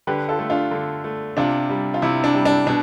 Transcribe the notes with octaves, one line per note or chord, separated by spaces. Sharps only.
D3 G4 B4
F4 A4
A3
D4 F4
D3
A3
C3 D4 F4
G3
F4
C3 E4
D4
G3
D4
B2 D4